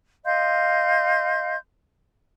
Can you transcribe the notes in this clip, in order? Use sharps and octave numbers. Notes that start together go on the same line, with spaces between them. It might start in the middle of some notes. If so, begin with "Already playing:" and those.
D#5 F5 C6 G6